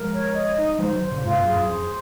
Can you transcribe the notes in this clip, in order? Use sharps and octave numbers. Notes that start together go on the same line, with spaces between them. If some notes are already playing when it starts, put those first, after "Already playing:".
Already playing: F3 G#3 A#4
C#5
D#5
D#4
F3 G#3 C5
D#3 F#3
C5
A#2 C#3
G#2 C3 F4
F#2 A#2
G#4
F#2
F2 C5